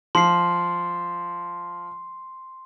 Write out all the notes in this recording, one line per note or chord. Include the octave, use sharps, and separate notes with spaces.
F3 C6 C7